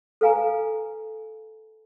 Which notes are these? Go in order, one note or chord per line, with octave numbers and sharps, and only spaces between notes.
A4 B4 F5 G#5 A#5